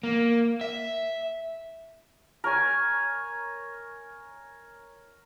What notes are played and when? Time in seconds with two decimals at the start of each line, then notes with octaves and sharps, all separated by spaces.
0.03 A#3
0.61 E5
2.44 A#4 C#5 G#5